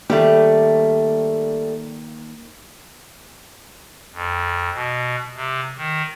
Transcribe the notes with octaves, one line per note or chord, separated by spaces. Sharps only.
D#3 G3 A3 A#3
F2
B2
C3
D#3